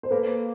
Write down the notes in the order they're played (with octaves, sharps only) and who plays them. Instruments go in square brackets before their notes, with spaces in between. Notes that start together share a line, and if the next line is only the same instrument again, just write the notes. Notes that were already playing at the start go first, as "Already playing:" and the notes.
[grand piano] C5
[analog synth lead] A#3 [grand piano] A4 B4